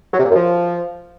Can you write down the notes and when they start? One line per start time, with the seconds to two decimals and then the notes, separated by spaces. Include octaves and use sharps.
0.14 F#3
0.19 C3
0.25 A#2
0.30 F#2
0.36 F3